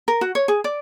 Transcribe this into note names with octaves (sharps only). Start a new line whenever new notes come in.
A#4
F#4
C#5
G#4
D5